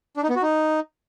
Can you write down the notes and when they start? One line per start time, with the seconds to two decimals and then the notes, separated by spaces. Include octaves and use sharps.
0.17 D4
0.23 D#4
0.30 B3
0.36 F#4
0.42 D#4